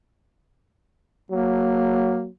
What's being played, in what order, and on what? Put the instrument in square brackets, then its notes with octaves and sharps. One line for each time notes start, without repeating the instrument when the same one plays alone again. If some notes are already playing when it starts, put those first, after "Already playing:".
[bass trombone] F#3 [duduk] A#3